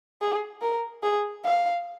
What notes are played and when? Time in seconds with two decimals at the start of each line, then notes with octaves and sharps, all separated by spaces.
0.21 G#4
0.62 A#4
1.03 G#4
1.44 F5